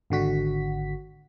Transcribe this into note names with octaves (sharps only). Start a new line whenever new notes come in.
G#1 D3 F#4 B6